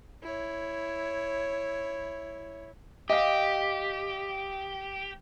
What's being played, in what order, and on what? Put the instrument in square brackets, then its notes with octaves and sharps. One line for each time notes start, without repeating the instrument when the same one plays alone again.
[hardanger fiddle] E4 C#5
[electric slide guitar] G4 [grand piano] D#5 F5